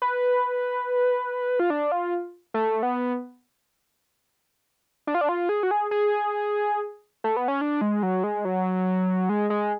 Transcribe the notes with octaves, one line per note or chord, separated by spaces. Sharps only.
B4
F4
D4
F4
A3
B3
D4
F4
D4
F4
G#4
F#4
G#4
G#4
A3
B3
C#4
D4
G#3
F#3
G#3
F#3
G#3
G#3